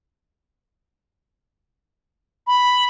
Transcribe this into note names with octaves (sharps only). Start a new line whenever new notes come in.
B5